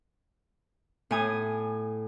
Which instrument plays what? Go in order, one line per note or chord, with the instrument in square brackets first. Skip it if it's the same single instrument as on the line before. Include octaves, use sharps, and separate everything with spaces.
[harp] A2 G#5 D#6